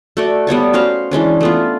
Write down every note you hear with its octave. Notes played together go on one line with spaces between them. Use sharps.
A3 F#4 D5
G3 B3 C#5 A5
C#4 F#4 C5 F5
E3 G#3 C#4 D4
A3 B3 F4